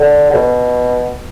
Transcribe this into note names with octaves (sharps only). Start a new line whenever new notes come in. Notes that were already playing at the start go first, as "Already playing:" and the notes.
Already playing: D3
D3
B2